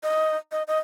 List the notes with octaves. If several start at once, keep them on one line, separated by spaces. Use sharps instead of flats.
D#5
D#5
D#5